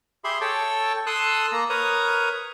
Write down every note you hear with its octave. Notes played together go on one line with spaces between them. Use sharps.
G4 G#4 E5 B5 C6
A4 C#5 G5 A5
A4 C6 D#6 E6 F#6
A#3 A#5
A#4 B4 C#5 D#6